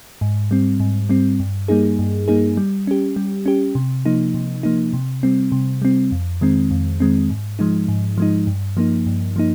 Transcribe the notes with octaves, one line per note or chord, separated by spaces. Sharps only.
G#2
G3 C4
G#2
G3 C4
G2
G3 A#3 D#4 G#4
G2
G3 A#3 D#4 G#4
G3
C#4 G4
G3
C#4 G4
C3
F3 A#3 D#4
C3
F3 A#3 D#4
C3
G3 C4
C3
G3 C4
F2
D#3 G#3 C4
F2
D#3 G#3 C4
G#2
F3 G#3 D#4
G#2
F3 G#3 D#4
G2
F3 A#3 D#4
G2
F3 A#3 D#4